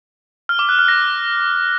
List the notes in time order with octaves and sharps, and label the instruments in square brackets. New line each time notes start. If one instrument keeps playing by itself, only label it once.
[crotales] F6
D6
F#6
F6
A#6